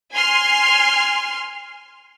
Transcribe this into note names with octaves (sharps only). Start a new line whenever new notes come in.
G#5 C6 F6